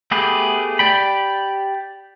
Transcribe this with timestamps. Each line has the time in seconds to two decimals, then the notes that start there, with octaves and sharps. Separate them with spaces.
0.11 A3 B3 G4 G#4 B4
0.79 G4 D5 G5 B5